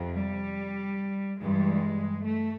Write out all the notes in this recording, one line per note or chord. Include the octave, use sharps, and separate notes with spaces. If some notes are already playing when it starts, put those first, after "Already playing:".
Already playing: F2 C3 F3
G3
G2 E3 G3 G#3
A3